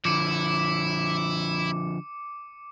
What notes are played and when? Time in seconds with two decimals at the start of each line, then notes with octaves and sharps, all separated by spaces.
0.05 D3 F3 E4 D6 C#7 D#7